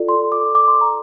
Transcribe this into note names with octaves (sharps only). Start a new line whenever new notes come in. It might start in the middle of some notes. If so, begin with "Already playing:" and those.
Already playing: F4 A4 D5
C6
D6
D6
C6
A#5